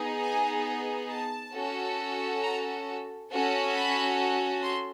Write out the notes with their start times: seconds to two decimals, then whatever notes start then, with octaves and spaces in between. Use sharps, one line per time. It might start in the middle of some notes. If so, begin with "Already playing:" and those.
Already playing: B3 D#4 G#4
0.20 G#5
1.09 A5
1.53 C#4 F#4 A4
2.42 A#5
3.30 C#4 F#4 A4
3.73 B5
4.62 C6